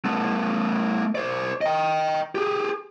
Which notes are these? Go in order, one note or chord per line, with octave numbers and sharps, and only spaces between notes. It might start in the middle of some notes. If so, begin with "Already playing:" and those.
A3 B3
C5 D5
D#5 G5
G4 G#4